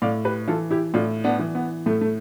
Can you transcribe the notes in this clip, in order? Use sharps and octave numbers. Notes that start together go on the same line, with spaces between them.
A2 D5 F5
G4 B4
E3 F4 A4
E4 G4
A2 D4 F4
B3 D4
E3
B3
A2 A3
A3